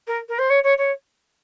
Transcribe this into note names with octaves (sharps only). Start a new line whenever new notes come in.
A#4
A#4
C5
C#5
C#5
C#5